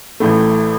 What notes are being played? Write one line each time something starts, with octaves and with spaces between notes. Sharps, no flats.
A1 A2 A3